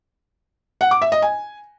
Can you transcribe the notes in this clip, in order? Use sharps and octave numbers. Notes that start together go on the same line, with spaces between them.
F#5
D6
E5
D#5
G#5